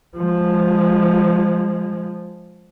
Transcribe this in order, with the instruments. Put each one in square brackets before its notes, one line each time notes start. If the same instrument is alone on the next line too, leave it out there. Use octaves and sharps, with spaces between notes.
[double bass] F3 G#3